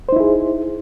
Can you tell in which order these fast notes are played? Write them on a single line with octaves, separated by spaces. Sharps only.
C5 D#4 E4 G#4